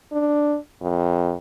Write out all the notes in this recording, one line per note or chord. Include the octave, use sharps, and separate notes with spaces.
D4
F2